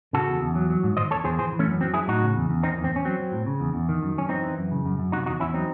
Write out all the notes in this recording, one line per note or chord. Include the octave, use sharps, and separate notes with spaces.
C#3 F#4 A4
E2
E2
F#3
F#3
G#2
D#3 C5 D#5
E2 A4 C#5
E2 G#4 C5
E3 G#4 C5
E3
A3 C#4
F#2
F#3 C4
F#3 E4 G#4
A2 D#4 F#4
C#3
E2
E2
D#3 C4 D#4
E2
C4
E2
C#4
F#3 C4
F#3
A2
C#3
E2
E2
D#3
F#2
F#2 C#4
E3 C4 D#4
E3
F#2
C#3
F#2
F#2
C3 D#4 F#4
E2 D#4 F#4
E2 C#4 E4
F#3 C4 D#4